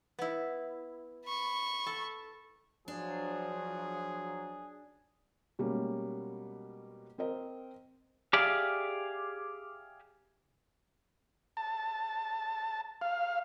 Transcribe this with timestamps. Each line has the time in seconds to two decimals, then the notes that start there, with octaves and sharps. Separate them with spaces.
0.19 B3 E4
1.25 B5 C#6
1.86 A4
2.88 F3 F#3 D4 G#4
5.59 B2 G3 G#3 A#3 C#4
7.18 C4 A#4 C5 D#5
8.33 G4 G#4 D5 E5 F5
11.57 A5
13.02 F5